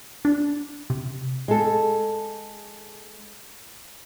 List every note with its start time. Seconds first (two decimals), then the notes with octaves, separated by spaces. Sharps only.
0.25 D4
0.90 C3
1.48 G#3 A4